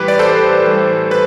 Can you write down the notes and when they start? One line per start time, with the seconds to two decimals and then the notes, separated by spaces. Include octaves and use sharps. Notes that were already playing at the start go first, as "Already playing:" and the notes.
Already playing: A2 E3 G3 G4 B4
0.08 D5
0.19 A4 C5
0.65 A2 E3 G3
1.11 B4